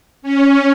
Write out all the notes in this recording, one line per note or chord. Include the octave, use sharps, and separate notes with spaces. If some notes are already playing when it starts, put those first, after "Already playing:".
C#4